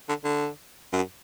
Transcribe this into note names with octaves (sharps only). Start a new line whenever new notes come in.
D3
D3
F#2